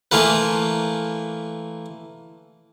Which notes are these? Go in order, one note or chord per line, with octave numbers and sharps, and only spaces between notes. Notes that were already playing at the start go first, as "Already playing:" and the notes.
E3 A3 A#3 F4 B4